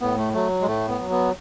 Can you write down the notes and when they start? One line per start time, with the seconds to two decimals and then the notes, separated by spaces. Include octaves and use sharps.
0.01 A2 B3
0.17 A3
0.33 F#3 A3
0.62 G#3
0.67 A2 A3
0.88 B3
0.99 F#3
1.10 B3